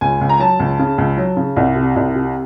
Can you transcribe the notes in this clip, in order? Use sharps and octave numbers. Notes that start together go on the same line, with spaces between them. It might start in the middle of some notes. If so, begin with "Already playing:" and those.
C#2 G#5
C#2
A#5
F#3 A5
C#2
C#3
C#2
F#3
C#3
C2
C3
C2
C3